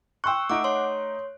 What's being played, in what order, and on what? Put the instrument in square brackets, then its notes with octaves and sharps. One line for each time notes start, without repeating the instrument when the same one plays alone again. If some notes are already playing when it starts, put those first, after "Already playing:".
[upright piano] G5 C6 F#6 [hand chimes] C#6 E6
[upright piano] A3 D#4 D7 [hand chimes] F#5 D6
[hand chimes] C#5 C6